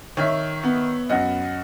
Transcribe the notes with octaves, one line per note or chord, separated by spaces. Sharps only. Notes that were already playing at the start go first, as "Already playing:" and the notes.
D#3 C#5 E5
B3
F#2 D#5 F#5